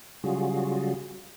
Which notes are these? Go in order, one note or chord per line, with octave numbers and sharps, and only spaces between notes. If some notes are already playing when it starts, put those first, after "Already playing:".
C#3 F#3 G3 F4 F#4 G#4